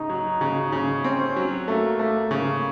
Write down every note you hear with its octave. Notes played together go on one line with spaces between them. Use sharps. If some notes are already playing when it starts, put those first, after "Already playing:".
Already playing: C#3 D#4
F#3
C#3
C#3
C4 C#4
F#3
A3 A#3
A3
C#3 A#3